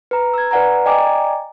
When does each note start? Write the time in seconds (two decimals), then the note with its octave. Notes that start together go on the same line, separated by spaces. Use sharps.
0.11 B4 A#5
0.34 E6 G#6
0.51 B4 D5 F#5 G#5 A#5
0.86 D5 D#5 G5 G#5 A#5 D6